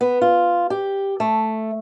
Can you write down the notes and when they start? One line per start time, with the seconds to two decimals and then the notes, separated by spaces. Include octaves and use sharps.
0.01 B3
0.21 F4
0.70 G4
1.20 A3